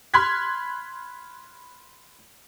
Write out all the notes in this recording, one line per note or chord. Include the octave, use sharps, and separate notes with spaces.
B5 C6 F6 F#6 G#6 B6